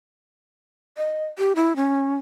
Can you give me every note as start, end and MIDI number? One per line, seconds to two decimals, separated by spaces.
0.98 1.24 75
1.39 1.53 67
1.56 1.75 64
1.76 2.14 61